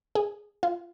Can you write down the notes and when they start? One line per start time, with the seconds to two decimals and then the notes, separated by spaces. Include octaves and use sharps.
0.15 G#4
0.63 F4